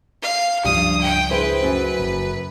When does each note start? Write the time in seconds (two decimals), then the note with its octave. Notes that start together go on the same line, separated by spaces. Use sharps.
0.22 F5
0.64 C#2 G2 C#3 F3 G3 D#6
1.01 G5
1.31 E4 G#4 B4 C5
1.63 F#2
1.99 F#1